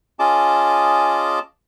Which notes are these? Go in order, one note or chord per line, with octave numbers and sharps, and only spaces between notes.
C#4 F4 G#4 D#5 A5 D6